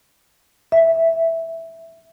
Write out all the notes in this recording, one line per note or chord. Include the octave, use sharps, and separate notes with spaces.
E5